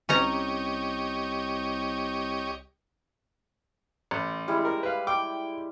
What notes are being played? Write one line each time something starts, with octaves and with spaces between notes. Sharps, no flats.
C2 C#4 D#4 G4 C#5 D#5 A#5
A1
G3 G#3 E4
A#4
B4 F5
G5 D6